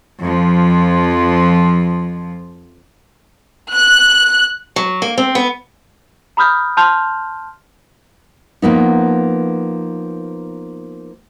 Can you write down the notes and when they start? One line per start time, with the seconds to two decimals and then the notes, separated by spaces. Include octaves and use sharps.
0.20 F2 F3
3.73 F#6
4.76 F#3
5.02 A#3
5.18 C4
5.35 B3
6.37 A#5 B5 D#6 F6 G6
6.77 A5 C6 F6 G6 F7
8.62 F3 A#3 B3 D#4